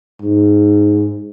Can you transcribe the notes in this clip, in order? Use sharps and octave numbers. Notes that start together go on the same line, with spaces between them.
G#2